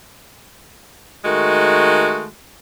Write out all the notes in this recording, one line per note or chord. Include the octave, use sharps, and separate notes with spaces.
D#3 G#3 A3 F#4